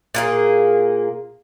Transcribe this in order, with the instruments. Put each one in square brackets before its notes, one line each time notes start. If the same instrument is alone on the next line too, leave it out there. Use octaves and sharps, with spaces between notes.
[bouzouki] A#2 A#3 G#4